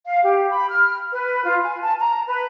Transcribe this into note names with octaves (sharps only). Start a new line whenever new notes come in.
F5
G4
B5
F6
B4
F4
G#5
A5
A#5
B4